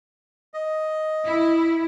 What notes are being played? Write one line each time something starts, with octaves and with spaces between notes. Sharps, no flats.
D#5
E4